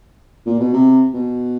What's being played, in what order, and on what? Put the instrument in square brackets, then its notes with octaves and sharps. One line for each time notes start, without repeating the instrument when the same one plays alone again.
[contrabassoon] A#2
B2
C3
B2